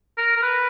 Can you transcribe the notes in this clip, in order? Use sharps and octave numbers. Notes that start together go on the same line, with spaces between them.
A#4
A#4
B4